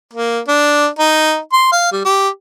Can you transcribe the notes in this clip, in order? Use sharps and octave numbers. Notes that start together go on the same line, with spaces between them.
A#3
D4
D#4
C6
F5
G3
G4